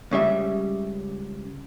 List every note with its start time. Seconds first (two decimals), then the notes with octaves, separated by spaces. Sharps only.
0.11 C#2 C#3 G3 E5